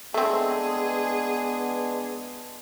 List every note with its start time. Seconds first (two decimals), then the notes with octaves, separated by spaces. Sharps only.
0.14 G#3 A3 B3 C4 D4 G#4